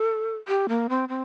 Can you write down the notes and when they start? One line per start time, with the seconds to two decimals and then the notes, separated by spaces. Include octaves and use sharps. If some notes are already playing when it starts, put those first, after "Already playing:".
Already playing: A4
0.48 G4
0.69 A#3
0.89 C4
1.09 C4